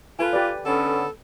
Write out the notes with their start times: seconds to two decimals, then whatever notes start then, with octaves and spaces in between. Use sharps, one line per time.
0.19 F4 A4 B4 G#5
0.33 G4 B4 D5
0.65 D3 B3 C#4 A4